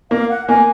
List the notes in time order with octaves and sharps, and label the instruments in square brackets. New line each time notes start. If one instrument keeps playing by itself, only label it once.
[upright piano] A#3 [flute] F5
[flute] F#5
[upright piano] A#3 [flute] G#5